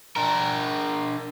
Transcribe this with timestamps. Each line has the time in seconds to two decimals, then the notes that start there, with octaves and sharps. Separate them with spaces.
0.16 D4 A#4